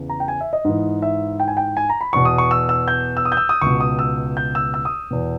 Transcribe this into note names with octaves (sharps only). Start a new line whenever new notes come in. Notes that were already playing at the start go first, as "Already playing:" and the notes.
Already playing: E2 C#3
A#5
G5
G#5
E5
D#5
G#2 E3
E5
G5
G#5
G5
G#5
A#5
B5
E2 B2 C#6
D#6
C#6
E6
E6
G6
E6
D#6
G6
E6
D#6
C#2 B2 C#6
D#6
E6
G6
E6
E6
D#6
E2 B2